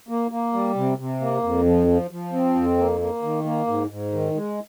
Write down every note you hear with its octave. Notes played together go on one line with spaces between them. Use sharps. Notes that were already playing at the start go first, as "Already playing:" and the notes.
A#3
A#3
G3
C3
C3
A#3
F2
F3
F3
F3
C4
F2
A#3
A#3
D#3
A#3
G#2
G#2
D#3
G#3